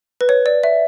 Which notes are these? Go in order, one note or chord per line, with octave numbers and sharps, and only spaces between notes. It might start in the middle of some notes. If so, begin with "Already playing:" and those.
B4
C#5
D5
E5